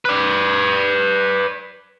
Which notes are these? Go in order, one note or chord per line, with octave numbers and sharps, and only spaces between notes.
B4 D5